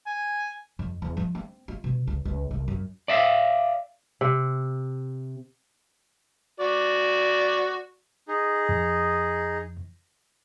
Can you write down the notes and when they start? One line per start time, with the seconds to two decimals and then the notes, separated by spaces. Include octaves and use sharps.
0.06 G#5
0.79 F2
1.02 E2
1.17 F3
1.35 C4
1.68 F4
1.84 B2
2.07 C#2
2.25 C#2
2.51 C2
2.68 F#2
3.08 D5 E5 F5
4.21 C3
6.60 F#4 D5
8.28 D#4 G#4
8.69 F2